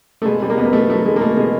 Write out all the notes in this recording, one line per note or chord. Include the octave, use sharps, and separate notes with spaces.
A3
B2 G#3
B2 G3
A#3
B2 B3
A#3
B2 A3
F#3 A3
B2 G#3
A#3
B2 A3
B2 G#3